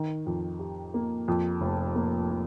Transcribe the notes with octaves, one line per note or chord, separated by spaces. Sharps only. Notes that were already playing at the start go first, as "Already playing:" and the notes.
Already playing: D#3
F2
G4
A#3
F2
F1
A#3
F3